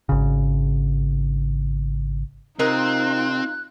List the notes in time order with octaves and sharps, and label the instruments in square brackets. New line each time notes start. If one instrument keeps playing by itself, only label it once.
[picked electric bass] G#1 C#3
[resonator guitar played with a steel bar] C3 A#4 D#5 [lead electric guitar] C4 [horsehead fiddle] D#4 F4 [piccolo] F#6